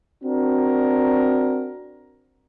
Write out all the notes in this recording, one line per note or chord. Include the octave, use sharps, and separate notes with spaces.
C4 D4 F#4 A#4